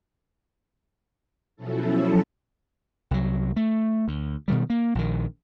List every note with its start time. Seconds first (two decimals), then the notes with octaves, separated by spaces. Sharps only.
1.56 B2 F3 F#3 C#4 E4 A4
3.11 C2 F#3
3.56 A3
4.08 D2
4.48 B2 D#3 G3
4.70 A#3
4.95 A#1 D#3